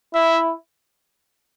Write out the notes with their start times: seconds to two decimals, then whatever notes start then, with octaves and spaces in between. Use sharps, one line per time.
0.14 E4 E5